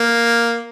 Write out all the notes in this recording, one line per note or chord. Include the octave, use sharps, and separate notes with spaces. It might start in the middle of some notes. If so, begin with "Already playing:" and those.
Already playing: A#3